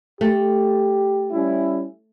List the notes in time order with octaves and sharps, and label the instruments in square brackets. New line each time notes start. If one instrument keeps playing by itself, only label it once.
[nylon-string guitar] A3 [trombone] G4
[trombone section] G3 C#4 E4